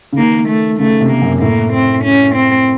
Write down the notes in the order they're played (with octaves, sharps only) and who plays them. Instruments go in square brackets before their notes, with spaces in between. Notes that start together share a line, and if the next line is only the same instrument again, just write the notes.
[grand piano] C#3
[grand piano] D#3 [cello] A#3
[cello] A3
[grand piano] C#3 [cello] A3
[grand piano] C3
[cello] A#3
[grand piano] F#2
[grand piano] A2 [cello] A#3
[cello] C4
C#4
C4